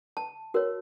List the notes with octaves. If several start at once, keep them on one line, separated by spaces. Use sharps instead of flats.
A5
F#4 A#4 C#5